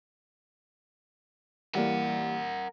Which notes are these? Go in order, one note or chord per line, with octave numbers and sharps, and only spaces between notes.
E3 G3 A#3 A#4 F#5